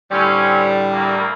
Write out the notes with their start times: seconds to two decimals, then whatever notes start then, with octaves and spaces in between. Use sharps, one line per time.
0.11 A2 D3 G3 C4 C#4
0.93 C2 A#3